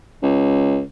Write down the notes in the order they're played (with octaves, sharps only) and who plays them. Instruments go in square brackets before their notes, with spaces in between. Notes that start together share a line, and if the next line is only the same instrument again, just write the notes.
[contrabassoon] C#2